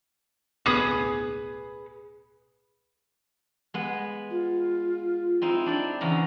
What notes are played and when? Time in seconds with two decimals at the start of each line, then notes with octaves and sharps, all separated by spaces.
0.66 D1 B1 B3 G#4 B4 D#6
3.74 G#3 B3
4.31 F4
5.42 C4 D#4 E4
5.66 D4 D5 G5
6.01 E2 C#3 A#5